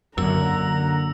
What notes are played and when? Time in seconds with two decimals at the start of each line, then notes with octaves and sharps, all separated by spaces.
0.18 F#2 D3 A#3 F#5 A#5 E6